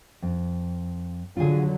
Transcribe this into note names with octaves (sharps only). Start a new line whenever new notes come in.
F2
D3 F#3 F4 G#4